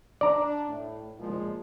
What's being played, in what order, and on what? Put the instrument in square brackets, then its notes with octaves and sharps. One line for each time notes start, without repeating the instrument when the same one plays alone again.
[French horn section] D4 [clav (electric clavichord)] D5 A#5
[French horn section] A2
A#2 F3 G#3